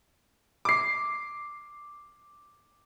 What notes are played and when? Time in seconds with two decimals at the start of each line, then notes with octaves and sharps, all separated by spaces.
0.65 D6 C7